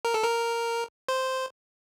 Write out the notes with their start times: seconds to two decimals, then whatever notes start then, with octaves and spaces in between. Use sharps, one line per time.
0.05 A#4
0.14 A4
0.24 A#4
1.09 C5